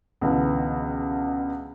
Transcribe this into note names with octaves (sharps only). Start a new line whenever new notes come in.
C#2 B2 D3 E3 B3